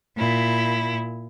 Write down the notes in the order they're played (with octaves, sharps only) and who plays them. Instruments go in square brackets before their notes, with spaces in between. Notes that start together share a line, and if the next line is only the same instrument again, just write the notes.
[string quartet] A#2 E4